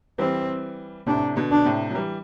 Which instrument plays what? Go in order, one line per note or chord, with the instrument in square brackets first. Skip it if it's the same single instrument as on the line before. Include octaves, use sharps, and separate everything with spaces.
[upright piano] E3 G3 [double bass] C4
[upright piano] A2 C3 [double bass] D4
[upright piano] B2 D3
[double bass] D4
[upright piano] A2 C3
F#3
E3 G3